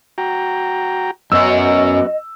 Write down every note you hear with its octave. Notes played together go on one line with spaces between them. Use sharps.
F#4 G5 A#5
F#2 B3 C#4 F#4 D#5 E6